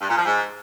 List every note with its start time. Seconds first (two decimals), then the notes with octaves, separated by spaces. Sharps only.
0.01 G2
0.09 A#2
0.17 F3
0.25 G#2